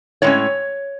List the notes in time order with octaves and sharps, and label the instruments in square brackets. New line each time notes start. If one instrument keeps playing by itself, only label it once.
[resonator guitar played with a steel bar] A2 G#3 C#4 C#5